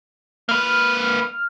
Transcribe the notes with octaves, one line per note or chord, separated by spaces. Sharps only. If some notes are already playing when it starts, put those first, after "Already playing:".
A#3 B4 F6